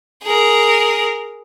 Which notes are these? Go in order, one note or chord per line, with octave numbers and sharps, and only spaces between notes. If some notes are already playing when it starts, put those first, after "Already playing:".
G#4 A#4